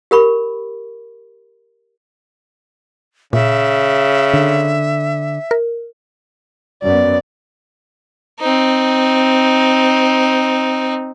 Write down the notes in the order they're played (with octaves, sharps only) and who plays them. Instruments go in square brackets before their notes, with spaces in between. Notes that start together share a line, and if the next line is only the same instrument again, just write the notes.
[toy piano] G4 A#4 B5 C#6
[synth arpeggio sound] A#2 [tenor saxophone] C#3 [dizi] E5
[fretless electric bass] D3
[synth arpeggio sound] A#4
[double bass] F#2 B3 [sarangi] D5
[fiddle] C4 D#4